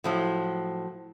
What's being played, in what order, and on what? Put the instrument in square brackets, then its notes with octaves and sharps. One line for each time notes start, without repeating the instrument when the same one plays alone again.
[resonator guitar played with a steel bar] A2 F3 F#3